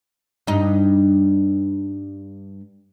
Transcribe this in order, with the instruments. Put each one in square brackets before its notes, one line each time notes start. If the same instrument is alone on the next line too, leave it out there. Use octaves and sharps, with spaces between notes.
[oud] G2 D#4